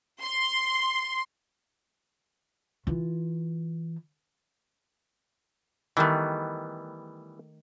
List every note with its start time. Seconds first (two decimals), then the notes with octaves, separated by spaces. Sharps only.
0.21 C6
2.87 E3 F4
5.97 D#3 E3 G3 A3 B3